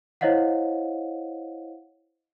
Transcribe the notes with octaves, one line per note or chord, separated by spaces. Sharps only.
E4 C5 C#5 D#5 F5 F#5